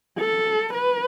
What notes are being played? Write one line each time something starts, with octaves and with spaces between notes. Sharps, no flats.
A4
B4